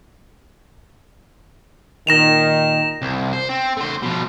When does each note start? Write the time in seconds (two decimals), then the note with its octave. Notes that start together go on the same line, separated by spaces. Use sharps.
2.07 A#2 D#3 A#6 E7 F7
3.02 C2
3.33 C5
3.49 C4
3.77 A3 C5
4.03 B2 F3